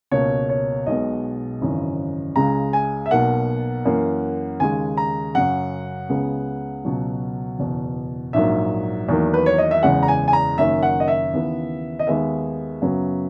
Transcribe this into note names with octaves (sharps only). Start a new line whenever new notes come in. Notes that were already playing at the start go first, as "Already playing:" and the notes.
C#2 B2 A#3 C#5
C#5
B1 B2 G#3 B3 D#5
G#1 F#2 C#3 E3
C#2 C#3 G#3 A#5
G#5
E5
B1 B2 A#3 F#5
F#2 E3 A#3
D#2 C#3 G#3 G#5
A#5
F#2 C#3 F#3 F#5
C#2 C#3 G#3 B3
C#2 B2 F#3
F#1 E2 B2
A#1 G#2 F#3 A#3 E5
E2 D#3 F#3 A#3
B4
C#5
D#5
E5
F#1 E2 C#3 G#3 F#5
A#5
G#5
G#5
A#5
F#1 F#2 D#3 A#3 E5
F#5
D#5
E5
D#2 C#3 E3 B3
D#5
D#2 D#3 G#3 B3 E5
F#2 C#3 F#3 B3